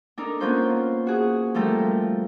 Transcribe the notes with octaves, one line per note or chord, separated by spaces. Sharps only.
D4 D#4 A4 A#4
A#3 B3 C#4 F4 C5
F#4 G#4
F3 G3 A3 A4 A#4